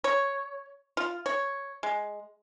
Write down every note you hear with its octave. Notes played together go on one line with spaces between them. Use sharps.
C#5
F4
C#5
G#3